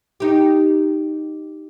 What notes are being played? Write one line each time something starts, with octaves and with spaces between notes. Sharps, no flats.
D#4 G4